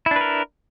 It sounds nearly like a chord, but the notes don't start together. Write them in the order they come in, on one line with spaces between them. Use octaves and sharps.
E4 D4 B4 A#4